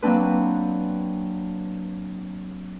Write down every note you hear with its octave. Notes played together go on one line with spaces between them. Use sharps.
F#3 A#3 C4 D4 B4